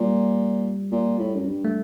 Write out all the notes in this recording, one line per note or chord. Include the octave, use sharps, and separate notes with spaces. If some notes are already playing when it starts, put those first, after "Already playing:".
Already playing: A#2 G3
A#2
A2
F#2
G2
A3